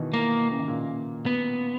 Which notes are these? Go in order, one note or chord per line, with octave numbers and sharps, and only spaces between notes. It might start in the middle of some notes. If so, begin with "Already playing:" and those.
Already playing: B2 D#3 E3
A#3
C#3
D#3
A#2 C#3
B3